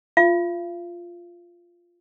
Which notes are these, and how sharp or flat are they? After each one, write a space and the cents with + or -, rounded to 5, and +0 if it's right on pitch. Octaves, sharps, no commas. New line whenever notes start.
F4 +0 F5 -40